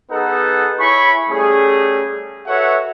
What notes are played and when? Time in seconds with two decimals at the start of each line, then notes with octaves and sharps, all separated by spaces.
0.11 B3 D#4 G#4 A4 B4 F#5
0.79 E4 C#5 G#5 B5 C#6
1.30 G3 A3 C#4 G#4
2.46 F#4 A4 B4 C#5 E5 F#5